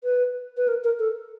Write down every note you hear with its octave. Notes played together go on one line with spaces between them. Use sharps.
B4
B4
A#4
A#4
A4